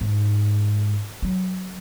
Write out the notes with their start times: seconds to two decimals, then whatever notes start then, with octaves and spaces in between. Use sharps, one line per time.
0.01 G#2
1.22 F#3